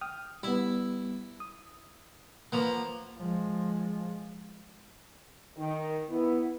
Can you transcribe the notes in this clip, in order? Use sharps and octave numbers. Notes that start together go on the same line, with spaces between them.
G5 D#6 F6
G3 B3 E4
D#6
F3 A#3 B4 F#5
F3 G#3
D#3
E3 B3 E4